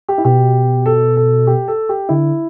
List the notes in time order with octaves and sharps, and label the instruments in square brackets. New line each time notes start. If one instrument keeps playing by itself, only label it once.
[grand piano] G4
E4
[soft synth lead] B2 [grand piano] G4
[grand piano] A4
A4
G4
A4
G4
[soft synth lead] D3 [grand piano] E4